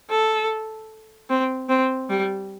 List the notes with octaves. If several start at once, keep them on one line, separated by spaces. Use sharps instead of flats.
A4
C4
C4
G3